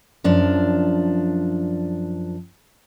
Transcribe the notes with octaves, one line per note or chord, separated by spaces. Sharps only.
F#2 F3 D4